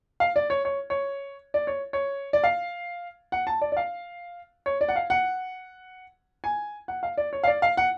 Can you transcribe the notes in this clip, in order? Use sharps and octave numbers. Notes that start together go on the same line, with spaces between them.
F5
D5
C#5
C#5
C#5
D5
C#5
C#5
D5
F5
F#5
A5
D5
D5
F5
C#5
D5
F#5
F5
F#5
G#5
F#5
F5
D5
C#5
F5
D5
F5
F#5